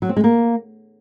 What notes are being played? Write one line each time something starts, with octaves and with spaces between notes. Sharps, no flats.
F#3
C4
G#3
A#3